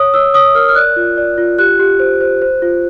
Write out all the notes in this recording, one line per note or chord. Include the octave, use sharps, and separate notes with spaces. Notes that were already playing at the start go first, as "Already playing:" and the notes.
Already playing: C#5 D#6
C#5 E6
C#5 D#6
A#4 F6
F6
D5 F#6
F4
D5
F4
G4 F#6
G4
C5
C5
C5
F4